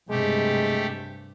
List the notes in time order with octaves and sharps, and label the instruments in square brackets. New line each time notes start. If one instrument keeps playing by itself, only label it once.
[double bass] G2 C3 [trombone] G#3 [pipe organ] A3 G4